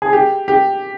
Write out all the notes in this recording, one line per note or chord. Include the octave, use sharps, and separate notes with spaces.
G#4
G4
G4